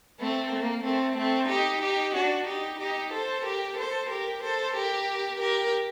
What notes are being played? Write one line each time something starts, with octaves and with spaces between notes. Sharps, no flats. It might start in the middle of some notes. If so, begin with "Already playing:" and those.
A3 C4
A#3
A3 C4
A3 C4
D#4 G4
D#4 G4
D4 F#4
D#4 G4
D#4 G4
A4 C5
G4 A#4
A4 C5
G4 A#4
A4 C5
G4 A#4
G4 A#4